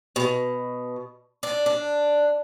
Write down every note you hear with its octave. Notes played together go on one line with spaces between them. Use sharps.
B2
D4
D4